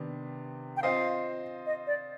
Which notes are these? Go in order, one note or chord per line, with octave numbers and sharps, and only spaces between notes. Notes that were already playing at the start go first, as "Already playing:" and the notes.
Already playing: C3 D#3 B3 D4
G5
C4 F4 C5 D#5 F5
D#5
D5